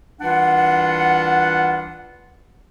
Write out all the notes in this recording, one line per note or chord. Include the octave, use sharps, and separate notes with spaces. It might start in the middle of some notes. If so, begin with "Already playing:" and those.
C2 E3 D4 F4 F#5